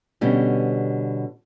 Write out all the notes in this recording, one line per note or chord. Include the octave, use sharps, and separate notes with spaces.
B2 D3 G3 C#4 G4